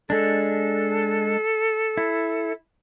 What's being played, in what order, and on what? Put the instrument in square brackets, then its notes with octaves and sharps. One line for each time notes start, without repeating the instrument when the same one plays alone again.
[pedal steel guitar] G#3 D4 [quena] A4
[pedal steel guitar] E4